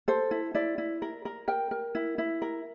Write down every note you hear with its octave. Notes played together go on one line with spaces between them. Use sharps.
A4 C5
E4
E4 D5
E4
A#4
A#4
A#4 G5
A#4
E4
E4
A#4